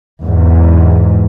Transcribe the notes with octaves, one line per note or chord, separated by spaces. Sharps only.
E2 G#2